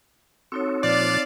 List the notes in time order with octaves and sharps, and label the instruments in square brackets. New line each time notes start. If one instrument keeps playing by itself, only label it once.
[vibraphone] C4 D#4 C#5 [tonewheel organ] F#4 A4
[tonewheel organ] A#2 F3 F#6 [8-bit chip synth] D5 [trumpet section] F5 A5